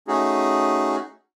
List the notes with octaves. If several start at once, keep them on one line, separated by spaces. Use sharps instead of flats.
A3 C#4 D#4 F#4 G#4